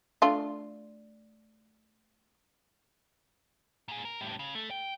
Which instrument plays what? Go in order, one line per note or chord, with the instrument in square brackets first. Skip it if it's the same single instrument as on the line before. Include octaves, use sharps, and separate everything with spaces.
[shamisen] A3 D4 F4
[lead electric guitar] A#2 G#4
A#4
A2 G3
C#3
A3
G5